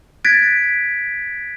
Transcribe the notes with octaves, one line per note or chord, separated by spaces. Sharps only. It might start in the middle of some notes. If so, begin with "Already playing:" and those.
F#6 G#6 A6 B6 D7